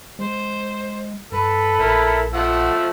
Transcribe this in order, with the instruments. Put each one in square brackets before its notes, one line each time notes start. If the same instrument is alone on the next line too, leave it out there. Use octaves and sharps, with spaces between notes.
[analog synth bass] G#3 [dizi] C5
[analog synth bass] G2 [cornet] A4 [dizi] B4
[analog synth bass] A#1 [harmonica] E4 A#4 B5
[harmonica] F3 E6 [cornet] A3 [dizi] F#5